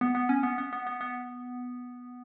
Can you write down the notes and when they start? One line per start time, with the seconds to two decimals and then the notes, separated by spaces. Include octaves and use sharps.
0.01 B3
0.15 B3
0.29 C#4
0.43 B3
0.58 B3
0.73 B3
0.87 B3
1.01 B3